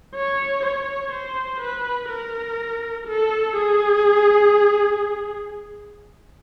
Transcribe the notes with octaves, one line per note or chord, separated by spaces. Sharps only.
C#5
C#5
C5
B4
A#4
A4
G#4